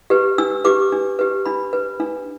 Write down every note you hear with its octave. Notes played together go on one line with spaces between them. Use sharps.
G4 B4
D4 E6
G4 B4 D6
D4
G4 B4
D4 B5
B4
D4